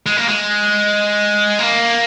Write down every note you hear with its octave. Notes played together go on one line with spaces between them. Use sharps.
G#3
A#3
G#3
A#3